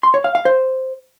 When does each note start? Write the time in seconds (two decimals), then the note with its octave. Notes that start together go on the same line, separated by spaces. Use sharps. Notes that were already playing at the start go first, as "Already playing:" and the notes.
0.03 C6
0.14 C#5
0.24 F5
0.35 F5
0.45 C5